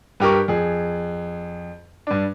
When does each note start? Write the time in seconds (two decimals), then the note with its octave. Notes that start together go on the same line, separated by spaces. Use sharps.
0.20 G2 G4 A#4 C#6
0.48 F2 G#4
2.07 G2 D4